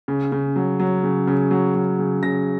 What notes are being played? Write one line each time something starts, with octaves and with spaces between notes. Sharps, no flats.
C#3
C#3
F#3
F#3
C#3
C#3
F#3
F#3
C#3
C#3 A#6